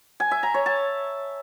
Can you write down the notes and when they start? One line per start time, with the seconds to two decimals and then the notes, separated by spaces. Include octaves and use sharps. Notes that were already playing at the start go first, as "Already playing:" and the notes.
0.20 G#5
0.31 E5
0.43 A#5
0.54 C#5
0.66 A5